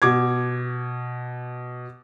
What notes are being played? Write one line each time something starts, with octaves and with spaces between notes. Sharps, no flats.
B2 D6 G#6